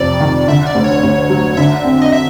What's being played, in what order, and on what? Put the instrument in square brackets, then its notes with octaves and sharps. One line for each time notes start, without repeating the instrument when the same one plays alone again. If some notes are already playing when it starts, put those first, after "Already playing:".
Already playing: [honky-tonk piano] F2 C3 [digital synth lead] D5
[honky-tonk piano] D#3
[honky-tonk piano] D3 [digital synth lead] E5
[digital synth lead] D5
[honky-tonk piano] D2
[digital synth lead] C#5
[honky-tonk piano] D2
F#3
[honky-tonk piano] D3 [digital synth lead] E5
[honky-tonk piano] C4
[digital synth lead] D#5
E5